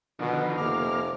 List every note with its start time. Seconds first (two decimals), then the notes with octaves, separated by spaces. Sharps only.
0.19 B2 D3 D#3 F3
0.58 F1 A#3 D6 F6